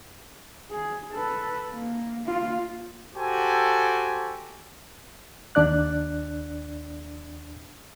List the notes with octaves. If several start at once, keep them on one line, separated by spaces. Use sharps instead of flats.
G#4
A4 B4
A#3
A#3 F4
F#4 G4 A4 C5 G5 G#5
D#2 D4 D5 F#6